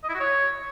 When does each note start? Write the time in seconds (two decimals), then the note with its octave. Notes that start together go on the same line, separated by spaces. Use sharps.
0.04 D#5
0.09 E4
0.14 F#4
0.20 C#5